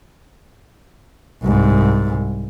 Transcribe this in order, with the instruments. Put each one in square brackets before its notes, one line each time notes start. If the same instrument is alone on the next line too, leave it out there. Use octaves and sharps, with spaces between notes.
[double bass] C2 G#2